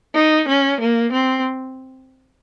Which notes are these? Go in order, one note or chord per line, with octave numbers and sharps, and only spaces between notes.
D#4
C#4
A#3
C4